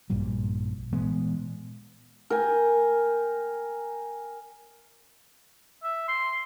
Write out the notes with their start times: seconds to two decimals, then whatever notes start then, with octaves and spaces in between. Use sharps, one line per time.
0.10 A#1 G2 A#2 G3
0.92 A#2 E3 G#3 B3
2.30 A#4 G5 G#5
5.83 E5
6.08 C6